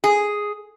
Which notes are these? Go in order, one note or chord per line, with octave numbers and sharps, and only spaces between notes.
G#4